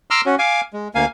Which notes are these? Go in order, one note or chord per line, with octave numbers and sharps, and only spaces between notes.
A#5 C6 D6 E6 F6
C#4 F#4
F5 G#5 D6
G#3
D2 A#3 F5 G#5